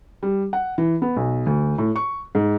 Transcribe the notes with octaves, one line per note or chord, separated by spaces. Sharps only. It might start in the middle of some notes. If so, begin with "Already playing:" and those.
G3
F#5
E3
B3
B1
D2
A2
C#6
G#2